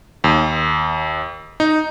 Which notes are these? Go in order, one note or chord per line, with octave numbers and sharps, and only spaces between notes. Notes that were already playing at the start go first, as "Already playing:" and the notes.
D#2
D#4